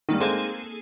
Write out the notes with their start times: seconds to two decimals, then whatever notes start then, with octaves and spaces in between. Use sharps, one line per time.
0.09 G2 D#3 A#3 D#4
0.20 G#3 A#3 C4 G#4 A4